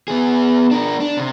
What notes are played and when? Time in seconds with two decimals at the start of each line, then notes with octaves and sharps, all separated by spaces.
0.08 B3 G#4
0.71 D4 A#4
1.00 D4
1.18 C3